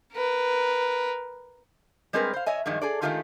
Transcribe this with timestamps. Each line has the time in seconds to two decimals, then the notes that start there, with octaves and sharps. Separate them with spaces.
0.14 A#4 B4
2.13 G3 G#3 C4 G#4 A#4 B4
2.34 C5 F5
2.46 C#5 D#5 E5 G#5
2.66 G2 D#3 F3 G#3
2.82 G#4 A4 D5
3.01 D#3 G#3 A3 F4 G4 G#4